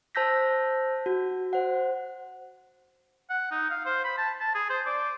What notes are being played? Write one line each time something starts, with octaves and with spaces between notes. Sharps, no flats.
C5 A5 E6 G6 A#6 B6
F#4
C5 F#5
F#5
D#4
F5
C5
B5
A5
A5
G#4
C5
D5